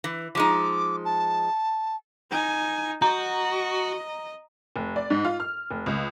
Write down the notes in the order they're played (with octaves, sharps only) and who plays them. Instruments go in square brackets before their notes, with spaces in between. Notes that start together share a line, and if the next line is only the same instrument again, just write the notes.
[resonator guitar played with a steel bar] E3
[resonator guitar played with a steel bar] F3 G#3 D#4 [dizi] D6
[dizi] A5
[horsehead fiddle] D#4 G#5
[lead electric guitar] F#4 [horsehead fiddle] D#5 [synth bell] A#5
[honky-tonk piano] F1
D5
G#2
F4
F6
F1
C#2